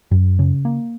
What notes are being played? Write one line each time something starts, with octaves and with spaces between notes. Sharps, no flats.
F#2
C#3
A#3